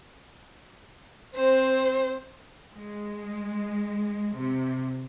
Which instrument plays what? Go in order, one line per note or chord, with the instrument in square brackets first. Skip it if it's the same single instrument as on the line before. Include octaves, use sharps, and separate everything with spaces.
[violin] C4 C5
[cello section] G#3
C3